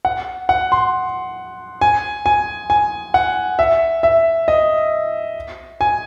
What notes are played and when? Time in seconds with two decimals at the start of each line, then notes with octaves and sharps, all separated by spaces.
0.05 F#5
0.49 F#5
0.72 C6
1.81 G#5
2.26 G#5
2.70 G#5
3.14 F#5
3.59 E5
4.03 E5
4.48 D#5
5.81 G#5